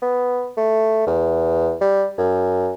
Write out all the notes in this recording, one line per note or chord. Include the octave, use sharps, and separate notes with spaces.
B3
A3
E2
G3
F#2